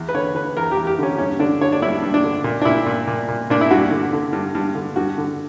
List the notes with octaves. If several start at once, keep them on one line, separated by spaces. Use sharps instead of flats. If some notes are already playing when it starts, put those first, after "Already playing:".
Already playing: E2
B4
D3 C#5
D3 B4
E2 A#4
G4
E2
G4
D3 C#4
G2 C#4
D3 D4
D3 C#5
D4
G2 E4
G2
D4
D3
A#2
D4
A#2 E4
A#2
A#2
A#2
A#2 D4
E4
G2 F#4
D3
D3
G2
G2
D3
G2 F#4
D3